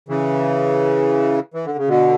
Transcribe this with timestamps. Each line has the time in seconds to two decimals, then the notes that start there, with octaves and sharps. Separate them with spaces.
0.09 C#3 E3
1.54 E3
1.66 D3
1.77 C#3
1.88 B2 D3